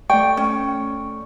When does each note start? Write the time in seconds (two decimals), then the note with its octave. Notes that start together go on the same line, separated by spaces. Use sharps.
0.10 A3 D5 G5 C#6
0.37 C#4